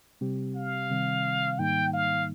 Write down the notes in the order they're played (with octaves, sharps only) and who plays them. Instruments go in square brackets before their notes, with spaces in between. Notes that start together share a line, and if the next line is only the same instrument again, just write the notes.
[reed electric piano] C3 G3 C4 G4
[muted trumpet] F5
[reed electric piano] C3 D#3 G3 C4
[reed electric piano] G#2 D#3 G3 A#3 D#4 [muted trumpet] G5
[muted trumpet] F5